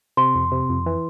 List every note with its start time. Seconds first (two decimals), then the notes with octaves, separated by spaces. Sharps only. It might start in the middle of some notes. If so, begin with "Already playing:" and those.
0.17 C3 C6
0.35 F2
0.51 C3
0.69 F2
0.86 E3